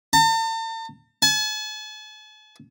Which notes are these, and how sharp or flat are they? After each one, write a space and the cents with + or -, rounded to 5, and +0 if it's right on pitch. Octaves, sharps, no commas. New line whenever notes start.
A5 +45
A5 -45